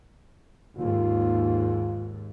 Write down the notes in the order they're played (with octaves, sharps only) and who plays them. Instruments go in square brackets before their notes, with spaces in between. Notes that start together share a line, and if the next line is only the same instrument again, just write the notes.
[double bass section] D#2 G#2 [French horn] F4